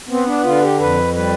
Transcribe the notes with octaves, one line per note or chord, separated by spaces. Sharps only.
B3 C4
D4
D3 F4
G4
F2 B4
G3 B4